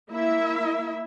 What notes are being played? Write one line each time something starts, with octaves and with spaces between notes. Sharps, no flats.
A#3 E4 E5